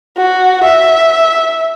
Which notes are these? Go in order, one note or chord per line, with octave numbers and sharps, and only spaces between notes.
F#4
E5